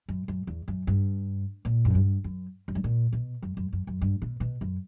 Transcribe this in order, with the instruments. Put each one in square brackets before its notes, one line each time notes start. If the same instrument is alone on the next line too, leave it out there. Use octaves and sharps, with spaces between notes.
[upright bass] F#2
F#2
E2
F#2
G2
A#2
F#2
G2
F#2
F#2
G2
A#2
B2
F#2
F#2
F#2
F#2
G2
B2
B2
F#2